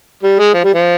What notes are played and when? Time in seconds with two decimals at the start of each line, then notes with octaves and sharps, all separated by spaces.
0.23 G3
0.39 G#3
0.54 F3
0.64 G3
0.74 F3